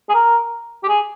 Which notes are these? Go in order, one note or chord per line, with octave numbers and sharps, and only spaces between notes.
G#4
A#4
G4
G#4